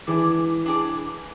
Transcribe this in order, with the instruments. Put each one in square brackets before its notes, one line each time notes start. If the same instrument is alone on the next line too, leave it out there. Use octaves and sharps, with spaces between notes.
[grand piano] E3 [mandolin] D4 G#4 D5
[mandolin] D4 G#4 D5